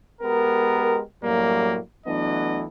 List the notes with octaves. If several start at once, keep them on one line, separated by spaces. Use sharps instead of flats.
G#3 B3 G4 A#4
F#2 A2 F#3 G3 A#3
E3 F#3 A3 B3 D4 D#5